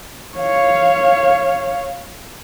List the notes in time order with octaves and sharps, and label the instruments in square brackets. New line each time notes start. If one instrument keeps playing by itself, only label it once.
[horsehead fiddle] C#5 F5